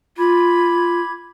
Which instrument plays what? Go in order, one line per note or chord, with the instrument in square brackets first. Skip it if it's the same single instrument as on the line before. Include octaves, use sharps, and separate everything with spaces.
[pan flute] F4 [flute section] B5 D6 G#6